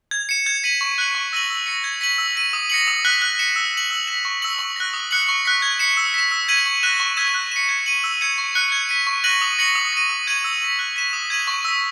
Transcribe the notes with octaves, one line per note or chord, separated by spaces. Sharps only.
G#6
C#7 E7
G#6
B6 D#7 F#7
C#6
F#6 C#7 F#7
C#6
E6 A#6 D#7 F#7
E6
A#6 C#7
G#6
B6 D#7 F#7
E6
B6 D#7 F#7
D#6
A#6 C#7 F#7
D#6
F#6 B6 F#7
F#6
C#7 E7
E6
B6 F#7
E6
B6 E7
C#6
E6 B6 F#7
C#6
F#6 A#6
D#6
F#6 C#7 F#7
C#6
F#6 B6
G#6
C#7 E7
E6
B6 E7
E6
G#6 B6 D#7 F#7
C#6
F#6 A#6 E7
C#6
E6 G#6 B6 E7
F#6
C#7 E7
G#6
D#7 F#7
E6
G#6 C#7 E7
C#6
F#6 C#7
G#6
B6 D#7
C#6
F#6 A#6 D#7 F#7
D#6
A#6 C#7 F#7
D#6
A#6 D#7
D#6
G#6 D#7 F#7
E6
B6 F#7
F#6
B6 E7
D#6
G#6 D#7 F#7
C#6
E6 B6